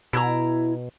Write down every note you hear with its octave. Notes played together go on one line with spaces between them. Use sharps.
B2 E4 A#5